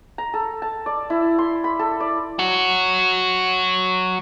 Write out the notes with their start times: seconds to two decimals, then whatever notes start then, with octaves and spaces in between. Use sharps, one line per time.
0.18 A#5
0.34 A4
0.62 A5
0.86 D5
1.10 E4
1.38 C6
1.64 B5
1.79 A4
2.00 D5
2.39 F#3 F#4